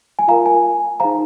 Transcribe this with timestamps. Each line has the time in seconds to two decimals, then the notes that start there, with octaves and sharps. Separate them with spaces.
0.19 G#5
0.28 F4 A#4 F5 A#5
0.46 G#5
1.00 D#4 G#4 C5 F5 A#5